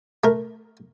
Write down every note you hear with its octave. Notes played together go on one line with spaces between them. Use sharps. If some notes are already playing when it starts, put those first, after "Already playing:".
A3 A#4